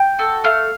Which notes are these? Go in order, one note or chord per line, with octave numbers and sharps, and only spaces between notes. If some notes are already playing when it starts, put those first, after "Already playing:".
Already playing: G5
F#4 A4
A3 F5